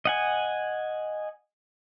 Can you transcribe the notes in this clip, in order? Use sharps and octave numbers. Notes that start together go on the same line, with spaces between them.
D#5 F#5 G#5